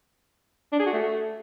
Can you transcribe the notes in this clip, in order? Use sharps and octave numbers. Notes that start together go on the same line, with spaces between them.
D4
G#4
F#4
A3